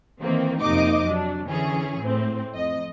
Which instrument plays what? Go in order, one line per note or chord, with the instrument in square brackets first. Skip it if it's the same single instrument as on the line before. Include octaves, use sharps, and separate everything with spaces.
[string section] D#3 E3 A#3 C4
F2 C3 A#3 D#4 D#5 D6
F#3 D4
D3 E3 C#4 G#4
A2 C4
F2 D#5